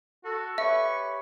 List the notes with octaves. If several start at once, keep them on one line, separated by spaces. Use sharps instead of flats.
F#4 A4
G4 B4 C#5 E5 C#6